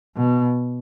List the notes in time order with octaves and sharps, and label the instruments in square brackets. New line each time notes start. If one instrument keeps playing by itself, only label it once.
[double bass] B2